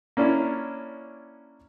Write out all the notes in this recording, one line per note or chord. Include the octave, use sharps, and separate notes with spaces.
A#3 C#4 D4 E4